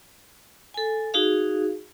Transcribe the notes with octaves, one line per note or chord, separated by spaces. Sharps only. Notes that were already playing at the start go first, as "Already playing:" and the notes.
A4 G#5
D#4 F#4 G#4 F5